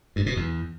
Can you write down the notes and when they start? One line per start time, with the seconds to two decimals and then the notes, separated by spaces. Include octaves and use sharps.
0.16 G2
0.26 B2
0.36 E2